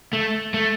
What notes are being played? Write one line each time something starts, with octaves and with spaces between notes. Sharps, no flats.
A3
A3